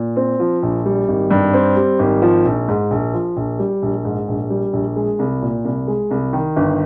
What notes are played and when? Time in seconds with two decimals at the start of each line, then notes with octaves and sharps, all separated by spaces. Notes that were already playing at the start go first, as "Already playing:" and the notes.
Already playing: A#2
0.16 C4
0.40 F3
0.63 A#1
0.86 G3
1.08 G#1
1.31 G2
1.53 C4
1.76 G3
1.99 G#1
2.22 F3
2.45 A#1
2.68 G#2
2.91 A#1
3.14 F3
3.36 A#1
3.59 G3
3.82 A#1
4.05 G#2
4.28 A#1
4.50 G3
4.73 A#1
4.96 G#3
5.19 C2
5.42 A#2
5.65 C2
5.87 G#3
6.11 C2
6.33 D#3
6.56 G1